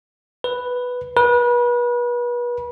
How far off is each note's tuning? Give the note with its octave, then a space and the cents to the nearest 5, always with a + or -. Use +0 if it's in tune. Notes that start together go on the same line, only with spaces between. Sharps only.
B4 +0
B4 -35